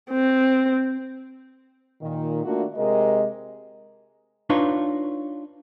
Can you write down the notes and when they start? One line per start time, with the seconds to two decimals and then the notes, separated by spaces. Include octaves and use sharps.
0.11 C4
2.01 A#2 D#3
2.44 A3 A#3 D4 F4 F#4
2.75 C3 G#3 A#4 D#5
4.50 D4 D#4 F4 B4 C#5